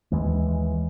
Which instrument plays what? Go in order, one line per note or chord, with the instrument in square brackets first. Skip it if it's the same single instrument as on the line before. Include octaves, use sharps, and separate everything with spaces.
[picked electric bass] D#2 E3 G#3